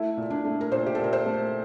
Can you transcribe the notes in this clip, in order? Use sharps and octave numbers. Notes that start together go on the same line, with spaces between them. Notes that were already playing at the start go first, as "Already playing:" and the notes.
Already playing: A3 E4
A#2
D4
A3
A#4
A#2 C5
G4
A4
A#2 A#4
C5
A3